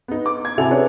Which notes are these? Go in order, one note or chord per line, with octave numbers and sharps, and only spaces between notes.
B3 D#4
D6
G#6
C3 E4 F#4 A4 G#5 F7
D4 E4 G#4 B4 C#5